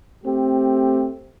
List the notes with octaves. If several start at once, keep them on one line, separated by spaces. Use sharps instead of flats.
A3 C4 G4